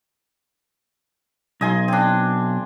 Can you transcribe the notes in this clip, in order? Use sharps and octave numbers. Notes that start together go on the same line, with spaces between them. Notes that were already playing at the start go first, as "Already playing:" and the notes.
B1 D#5 G#5 C6
C4 D4